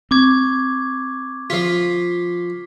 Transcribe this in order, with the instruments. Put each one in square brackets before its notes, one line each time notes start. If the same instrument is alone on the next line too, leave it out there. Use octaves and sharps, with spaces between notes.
[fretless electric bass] C4 [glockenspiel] C#6 D6 G#6
[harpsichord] F3 F4 [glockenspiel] B6 C7